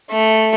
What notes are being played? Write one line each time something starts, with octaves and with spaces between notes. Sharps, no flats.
A3